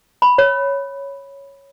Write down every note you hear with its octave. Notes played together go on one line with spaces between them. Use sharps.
B5
C#5